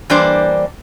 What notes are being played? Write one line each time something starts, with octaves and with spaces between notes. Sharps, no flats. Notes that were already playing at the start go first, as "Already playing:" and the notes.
E3 G3 A#3 D4 C5 D5